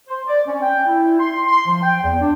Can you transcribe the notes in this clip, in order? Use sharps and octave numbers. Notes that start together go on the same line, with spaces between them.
C5
D5
C#4
G5
E4
C6
C6
F3
G5
E2
D4